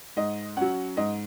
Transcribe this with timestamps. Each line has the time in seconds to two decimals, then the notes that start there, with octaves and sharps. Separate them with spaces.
0.17 G#2 D#5
0.57 F#3 C#4 F#5
0.97 G#2 D#5